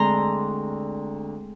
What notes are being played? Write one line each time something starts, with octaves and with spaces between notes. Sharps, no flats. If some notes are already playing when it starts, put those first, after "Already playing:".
Already playing: D2 D3 G#3 C4 A#5 C6